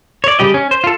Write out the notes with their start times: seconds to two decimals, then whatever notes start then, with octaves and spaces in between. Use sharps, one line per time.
0.24 C#5 D5
0.39 C#3 G3 G4 D#5
0.54 C#4
0.71 C5
0.84 F4 A4